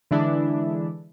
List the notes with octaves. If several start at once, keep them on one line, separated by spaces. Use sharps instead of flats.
D3 E3 G#3 D4 E4